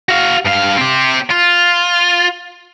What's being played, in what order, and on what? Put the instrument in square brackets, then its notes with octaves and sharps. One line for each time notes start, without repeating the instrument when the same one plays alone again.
[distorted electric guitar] F#4 F5
G2 F5
C4 G4
F4